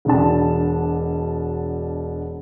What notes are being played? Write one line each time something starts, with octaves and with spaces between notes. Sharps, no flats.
E1 B2 D4 A5